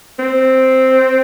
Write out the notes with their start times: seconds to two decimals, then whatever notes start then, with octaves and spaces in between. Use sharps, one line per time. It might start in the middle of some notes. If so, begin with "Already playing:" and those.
0.19 C4